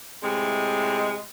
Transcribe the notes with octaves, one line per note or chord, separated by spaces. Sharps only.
A2 C3 G#3